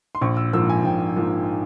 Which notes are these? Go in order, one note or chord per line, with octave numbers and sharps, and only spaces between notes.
C6
A#1 C#6
E6
G#2 F3 A#3 E6
G#5
A#1 G5
G#2 F3 A#3